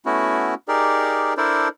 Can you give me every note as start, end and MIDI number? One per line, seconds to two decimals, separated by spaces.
0.06 0.54 57
0.06 0.54 59
0.06 0.54 61
0.06 0.54 64
0.06 0.54 66
0.68 1.34 63
0.68 1.34 67
0.68 1.34 68
0.68 1.34 70
0.68 1.34 74
1.37 1.68 62
1.37 1.68 64
1.37 1.68 69
1.37 1.68 70
1.37 1.68 72
1.37 1.68 74